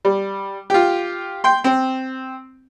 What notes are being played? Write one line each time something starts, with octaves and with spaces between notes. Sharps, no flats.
G3
F4 G4
G5 C6
C4